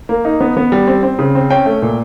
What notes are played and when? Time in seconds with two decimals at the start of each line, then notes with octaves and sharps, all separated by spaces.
0.09 A#3
0.25 D#4
0.41 B3
0.57 B3
0.72 G3
0.87 C4
1.03 C4
1.19 C#3
1.35 C4
1.50 C#4 G5
1.66 A3
1.82 A#2